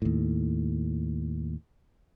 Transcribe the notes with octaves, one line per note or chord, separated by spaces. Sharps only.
D#2 A2